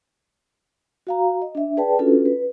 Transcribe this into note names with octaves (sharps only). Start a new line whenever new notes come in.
F#4 F5 A#5
D#5
D4 E5
G#4 B4 D5 G5 A5
C#4 D4 F4 F#4 A4 B4
B4